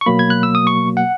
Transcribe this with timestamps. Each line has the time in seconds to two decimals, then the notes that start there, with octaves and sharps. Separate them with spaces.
0.01 C#6
0.06 B2 F#3 A#3 B5
0.19 G#6
0.30 F#6
0.43 E6
0.55 D#6
0.67 C#6
0.97 F#5